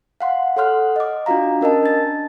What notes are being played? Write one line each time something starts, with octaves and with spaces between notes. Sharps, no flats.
F5 F#5 C6
A4 C#5 F#5 C6 F6 F#6
D#5 D6
D4 F4 F#4 F5 A#5
C#4 A#4 D#5 A5
D4 A6